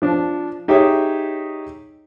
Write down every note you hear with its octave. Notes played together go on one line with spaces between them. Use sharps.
F3 D4
D#4 G4 G#4 C#5 D#5 E5